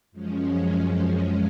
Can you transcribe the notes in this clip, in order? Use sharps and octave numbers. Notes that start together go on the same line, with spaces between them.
F#2 F3 G#3 C#4